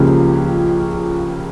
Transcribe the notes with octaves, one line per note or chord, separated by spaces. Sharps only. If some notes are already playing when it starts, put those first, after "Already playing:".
Already playing: C#2 C#3 F3 A#3 C#4 G4